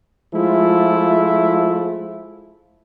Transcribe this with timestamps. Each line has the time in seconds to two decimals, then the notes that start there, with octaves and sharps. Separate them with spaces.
0.34 F3 G#3 A3 E4 F4